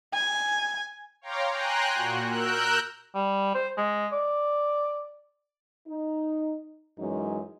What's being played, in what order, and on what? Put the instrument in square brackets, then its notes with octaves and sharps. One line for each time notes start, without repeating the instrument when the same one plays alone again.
[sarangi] G#5
[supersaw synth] C#5 F5 G5 A#5 C6 D6
G5 G#5 A#5 C6 F#6
A#2 F#4
A#4 E6 F#6 G6
[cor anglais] G3
C5
G#3
D5
[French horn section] D#4
F#2 E3 F#3 G#3 C#4 D#4